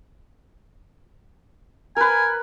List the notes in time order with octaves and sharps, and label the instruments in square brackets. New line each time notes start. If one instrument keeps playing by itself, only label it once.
[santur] A#4 B4 [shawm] G#5